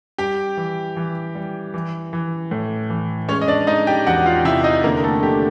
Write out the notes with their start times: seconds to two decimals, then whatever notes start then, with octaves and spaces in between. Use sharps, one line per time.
0.18 G3 G4 G5
0.57 E3
0.97 E3
1.35 G3
1.74 E3
2.13 E3
2.51 A2
2.90 E3
3.29 G#3 C#4 C#5
3.41 D#5
3.48 D4 D5
3.67 G#3 D#4 D#5
3.87 G4 G5
4.07 E2 F#4 F#5
4.26 F4 F5
4.45 C3 E4 E5
4.64 D#4 D#5
4.84 D3 A#3 A#4
4.97 A#4
5.04 A3 A4
5.23 D3 G4